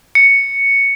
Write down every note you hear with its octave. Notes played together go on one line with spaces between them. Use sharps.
C#7